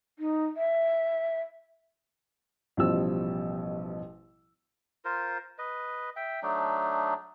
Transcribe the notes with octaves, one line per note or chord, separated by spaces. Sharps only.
D#4
E5
A1 B2 F3 G3 E6
F4 A#4 C5
B4 D#5
E5 G5
F#3 A3 D4 D#4